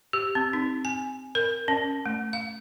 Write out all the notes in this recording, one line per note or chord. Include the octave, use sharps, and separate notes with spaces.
G4
C4
D#4
G#5
A#4
C#4
A3
F5